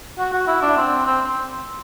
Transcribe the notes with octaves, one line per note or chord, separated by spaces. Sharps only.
F#4
F#4
E4
D4
C4
C4